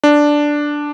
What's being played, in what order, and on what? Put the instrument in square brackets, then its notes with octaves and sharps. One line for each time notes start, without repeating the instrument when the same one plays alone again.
[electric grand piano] D4